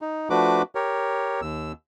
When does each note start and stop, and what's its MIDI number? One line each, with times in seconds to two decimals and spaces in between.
0.01 0.28 63
0.30 0.62 53
0.30 0.62 57
0.30 0.62 62
0.30 0.62 66
0.30 0.62 71
0.30 0.62 86
0.75 1.41 67
0.75 1.41 70
0.75 1.41 73
1.42 1.72 39
1.42 1.72 88